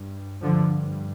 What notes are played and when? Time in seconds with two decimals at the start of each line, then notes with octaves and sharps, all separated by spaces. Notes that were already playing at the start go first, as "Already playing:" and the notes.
Already playing: G2
0.42 G2 D3 F3